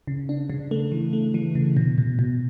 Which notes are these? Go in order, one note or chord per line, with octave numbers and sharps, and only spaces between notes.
C#3
D4
C#3
A3
E3
A3
E3
C#3
B2
B2
B2